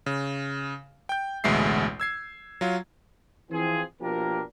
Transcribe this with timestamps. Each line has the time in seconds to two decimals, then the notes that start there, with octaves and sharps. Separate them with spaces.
0.06 C#3
1.09 G5 G6
1.44 A1 D2 B2 G#3 E5 C7
2.00 E6 G#6 C7
2.61 F#3 F4
3.51 E3 F3 C4 G#4
4.01 B2 F3 A#3 D4 G4 A#4